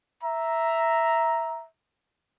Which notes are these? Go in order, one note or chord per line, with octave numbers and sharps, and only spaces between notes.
E5 A#5